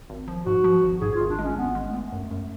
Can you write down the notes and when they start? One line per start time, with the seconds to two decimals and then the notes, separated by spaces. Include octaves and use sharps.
0.10 G#1
0.28 F3
0.46 G#2 F#4
0.64 F3
0.83 G#1
1.01 G#2 G#4
1.15 F4
1.21 G#1
1.30 D4
1.39 G#3
1.44 C#4
1.56 G#1 B3
1.75 G#3
1.84 A3
1.94 B3
2.12 F#2
2.31 F#2